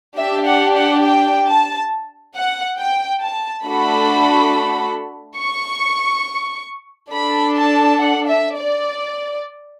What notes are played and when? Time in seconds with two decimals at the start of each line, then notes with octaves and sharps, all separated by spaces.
0.17 D4 G4 E5
0.46 F#5
0.76 F#5
1.04 G5
1.47 A5
2.35 F#5
2.78 G5
3.21 A5
3.65 A3 D4 F#4 A4 B5
5.38 C#6
7.11 D4 A4 B5
7.56 A5
7.99 F#5
8.28 E5
8.56 D5